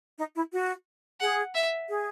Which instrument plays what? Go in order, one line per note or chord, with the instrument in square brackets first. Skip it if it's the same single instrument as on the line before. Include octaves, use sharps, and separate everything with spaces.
[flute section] D#4
E4
F#4
[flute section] G#4 [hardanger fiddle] F#5
[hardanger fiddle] E5
[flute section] G#4